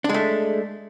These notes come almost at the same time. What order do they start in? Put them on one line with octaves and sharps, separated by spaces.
D4 G#3 A3